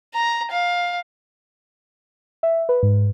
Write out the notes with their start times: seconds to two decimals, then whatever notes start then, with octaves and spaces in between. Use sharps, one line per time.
0.14 A#5
0.51 F5
2.43 E5
2.69 B4
2.83 G#2